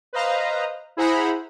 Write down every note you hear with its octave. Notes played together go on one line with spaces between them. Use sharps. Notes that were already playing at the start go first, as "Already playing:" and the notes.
B4 C5 D#5 F5 A#5
E4 G#4 C5 F#5 A#5 B5